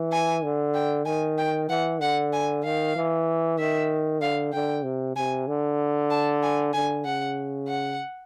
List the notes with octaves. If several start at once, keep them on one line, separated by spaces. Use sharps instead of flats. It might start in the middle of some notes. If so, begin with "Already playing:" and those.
Already playing: E3
G#5
D3
G5
D#3 G#5
G5
E3 F#5
D3 F#5
G#5
D#3 F5
E3
D#3 E5
D3 F5
D3 G5
C3
C3 G#5
D3
A5
G#5
D3 G#5
C#3 F#5
F#5